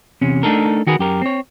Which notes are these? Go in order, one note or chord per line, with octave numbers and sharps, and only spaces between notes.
E2 C3 C#4
A3 D4 D#4 A4 A#4
D#3 F#4 G#4 A#4 B4
F#2 G4 A#4
C4 C#5